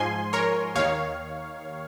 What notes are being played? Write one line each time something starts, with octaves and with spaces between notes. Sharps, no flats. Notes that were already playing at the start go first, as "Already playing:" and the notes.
Already playing: G#2 F3 G#5 C6
A#4 C#5
D#2 D#3 C#5 F5